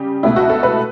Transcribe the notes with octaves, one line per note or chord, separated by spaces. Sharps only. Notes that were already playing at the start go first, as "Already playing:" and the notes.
Already playing: C#3 G3 G4
C#2 B2 A3 E4
F#4
A4
B4